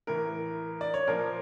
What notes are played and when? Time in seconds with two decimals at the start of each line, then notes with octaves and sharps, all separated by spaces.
0.07 A2 E3 A#4
0.81 D5
0.94 C#5
1.08 A#2 F3 A#4